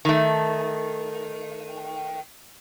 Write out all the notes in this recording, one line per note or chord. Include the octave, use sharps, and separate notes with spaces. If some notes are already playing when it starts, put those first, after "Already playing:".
D#3 A3